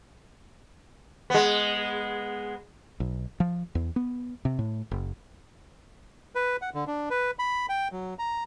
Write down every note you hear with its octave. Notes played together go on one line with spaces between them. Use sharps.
G#3 B3
B1
F3
E2
B3
C3
A2
F#1
B4
F#5
D3
D4
B4
B5
G5
F#3
A#5